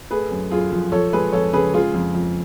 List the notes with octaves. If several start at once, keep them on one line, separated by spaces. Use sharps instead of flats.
A3 G#4 B4
F#2
F#2 F4 G#4
F3
F3 A4 C#5
G#3 G#4 B4
F2 A4 C#5
C#3 G#4 B4
G#3 F4 G#4
F2
F2